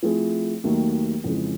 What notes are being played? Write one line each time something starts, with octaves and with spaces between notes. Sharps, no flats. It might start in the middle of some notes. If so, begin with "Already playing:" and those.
F3 A3 C4 E4 G#4
D#2 D#3 F#3 A3
F2 C#3 E3 G#3